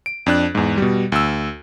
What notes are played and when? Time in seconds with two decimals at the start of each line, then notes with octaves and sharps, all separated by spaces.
0.06 D7
0.26 F2 D4 F#6
0.55 E2 G#2
0.78 B2 G3
1.12 D2 E6